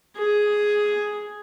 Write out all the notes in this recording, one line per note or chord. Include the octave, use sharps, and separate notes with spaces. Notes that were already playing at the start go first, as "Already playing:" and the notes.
G#4